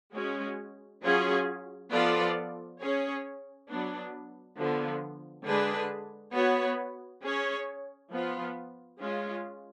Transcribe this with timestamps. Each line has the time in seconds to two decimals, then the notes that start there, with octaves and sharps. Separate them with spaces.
0.13 G#3 C#4 F#4
1.02 F#3 C#4 F4 G#4
1.91 F3 B3 F4 A4 D5
2.79 C#4 G#4 C#5
3.68 F#3 B3 D4
4.56 D3 F3 B3
5.45 D3 G#3 D4 G#4 B4
6.33 B3 F#4 C#5
7.21 C#4 G#4 C#5
8.11 F3 B3 F4
8.98 G#3 C#4 F4